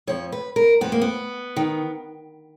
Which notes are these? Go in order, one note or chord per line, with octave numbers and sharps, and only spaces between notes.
F2 F3 C#5
B4
A#4
F2 F3 B3
A#3
B3
D#3